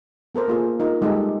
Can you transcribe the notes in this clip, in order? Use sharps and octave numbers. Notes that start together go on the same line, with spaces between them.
B3 A4 A#4 C5
A#3 F4 G#4
D#4 F4 A#4
G3 G#3 D#4 G4 A4